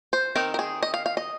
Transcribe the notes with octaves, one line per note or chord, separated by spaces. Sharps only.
C5
D#3 C4 D#4 A#4
A#4
G#4
D#5
F5
F5
D#5